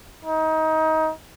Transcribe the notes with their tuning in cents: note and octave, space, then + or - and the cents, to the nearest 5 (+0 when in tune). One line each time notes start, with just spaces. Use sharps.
D#4 +25